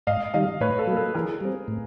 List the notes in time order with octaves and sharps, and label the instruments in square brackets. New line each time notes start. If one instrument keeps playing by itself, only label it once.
[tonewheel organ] G#2 [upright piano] D#5 F5
[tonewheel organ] D#3 G3 [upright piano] D#5 F5
[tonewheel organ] A2 [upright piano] B4 C#5
[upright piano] A4
[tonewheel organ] F#3
[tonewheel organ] A#3 [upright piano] A4
[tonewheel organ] E3 [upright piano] G#4 A#4
[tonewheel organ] G3 C4
A2